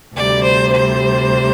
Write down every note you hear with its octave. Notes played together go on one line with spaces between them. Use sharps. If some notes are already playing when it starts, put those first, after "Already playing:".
D2 C3 G3 D5
C5
C5